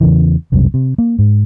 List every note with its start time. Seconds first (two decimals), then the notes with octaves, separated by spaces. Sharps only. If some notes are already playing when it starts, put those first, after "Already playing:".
0.01 E2 C#3 E3
0.52 E1 C2 F#2 C3
0.74 C3
0.98 A#3
1.19 G#2